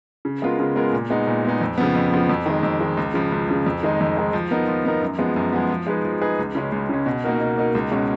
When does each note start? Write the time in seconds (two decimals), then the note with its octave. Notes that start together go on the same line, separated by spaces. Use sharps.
0.25 C#3
0.42 G#3 B3 F4 A#4
0.60 C#3
0.76 G#3 B3 F4 A#4
0.93 A#2
1.10 G#3 B3 D#4
1.27 A#2
1.45 G#3 B3 D#4
1.61 F2
1.78 C#3 F3 B3
1.95 F2
2.12 C#3 F3 B3
2.29 F2
2.46 D#3 G#3
2.63 F2
2.81 D#3 G#3
2.97 C#2
3.14 C#3 F3
3.32 C#2
3.48 C#3 F3
3.66 F2
3.83 D#3 G#3 D#4
4.00 F2
4.17 D#3 G#3 D#4
4.33 F3
4.51 B3 D#4 A#4
4.68 F3
4.85 B3 D#4 A#4
5.02 F#2
5.18 F3 G#3 B3
5.36 F#2
5.53 F3 G#3 B3
5.70 F3
5.87 G#3 D#4 G#4 B4
6.05 F3
6.21 G#3 D#4 G#4 B4
6.39 C#2
6.55 C#3 G#3 C#4
6.72 C#2
6.89 C#3 G#3 C#4
7.06 B2
7.24 A#3 D#4 F#4 A#4
7.41 B2
7.58 A#3 D#4 F#4 A#4
7.75 C#2
7.92 B2 G#3 C#4